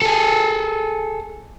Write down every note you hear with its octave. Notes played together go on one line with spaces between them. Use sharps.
G#4 A4